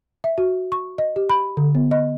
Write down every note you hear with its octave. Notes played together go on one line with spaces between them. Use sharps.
E5
F#4
C#6
D#5
G4
B5
D3
B3
D#5